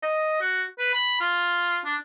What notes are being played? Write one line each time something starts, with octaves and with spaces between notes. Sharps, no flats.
D#5
F#4
B4
B5
F4
D4